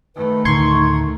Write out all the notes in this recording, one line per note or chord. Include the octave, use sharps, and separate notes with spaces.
D#3 A3 B4
D2 A2 D#4 C6 C#6 G#6